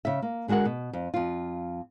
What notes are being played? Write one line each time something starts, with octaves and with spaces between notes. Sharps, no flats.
C#3 E5
A#3
D3 G#3 F#4 A#4 F#5
B2
F2
F2 F4